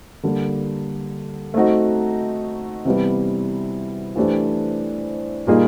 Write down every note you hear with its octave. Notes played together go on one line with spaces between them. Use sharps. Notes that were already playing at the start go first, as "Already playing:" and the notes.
D3 G3 A#3
A3 C4 D#4 F#4
C3 E3 G3 B3
E3 A3 D4 G4 C5
A#2 G3 A#3 D#4 G#4